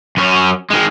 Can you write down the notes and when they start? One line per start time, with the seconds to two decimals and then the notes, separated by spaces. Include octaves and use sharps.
0.17 F#2 C#4
0.70 D#3 G#3